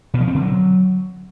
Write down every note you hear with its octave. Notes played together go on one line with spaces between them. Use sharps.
B2
F3
C4
D3
F#3